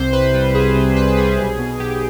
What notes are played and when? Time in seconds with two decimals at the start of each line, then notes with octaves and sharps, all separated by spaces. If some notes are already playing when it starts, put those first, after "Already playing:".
Already playing: C2 C3 C5
0.13 C2 B4
0.34 G3
0.55 C2 G#4
0.76 C3
0.96 C2 B4
1.17 G3 G#4
1.39 B1
1.59 B2
1.80 B1 G4